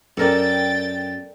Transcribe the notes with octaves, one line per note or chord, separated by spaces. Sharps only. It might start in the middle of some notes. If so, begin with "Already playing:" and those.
F#2 A4 A#4 D5 G5 A6